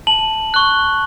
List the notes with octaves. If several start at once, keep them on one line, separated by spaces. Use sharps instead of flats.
A5 F#7
C#6 F#6